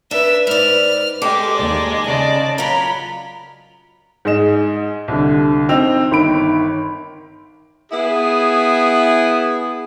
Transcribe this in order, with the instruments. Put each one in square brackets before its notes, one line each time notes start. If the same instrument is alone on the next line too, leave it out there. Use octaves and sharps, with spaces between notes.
[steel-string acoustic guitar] D4 [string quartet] B4 [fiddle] E5 E6
[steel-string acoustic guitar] G#2 D5 [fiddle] F6
[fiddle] G#3 [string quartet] G4 [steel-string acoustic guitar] A4 [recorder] D6
[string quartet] D#2 D5
[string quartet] C#3 D5 A5 [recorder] D#5
[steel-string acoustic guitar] F#3 F4 A#4 [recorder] A#5 [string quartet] B5
[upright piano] G#2 G#4 D#5 E7
C2 D3
C4 D#4 G5 E6 F7
G1 D#3 B5 D7
[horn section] B3 E4 G#4